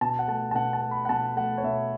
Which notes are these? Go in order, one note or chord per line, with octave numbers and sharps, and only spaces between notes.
B2 A5
F#5
A3 A5
A5
B2 F#5
A5
A3
B5
F#5
B2 A5
A3 F#5
C#5
B2 E5